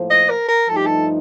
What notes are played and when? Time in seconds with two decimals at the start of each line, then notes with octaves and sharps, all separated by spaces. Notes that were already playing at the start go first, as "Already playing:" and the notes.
Already playing: A2 F3 A#3 F4 C5
0.10 D#5
0.30 A#4
0.49 A#4
0.69 G2 F3 A3 D#4 A4
0.76 G4
0.86 A4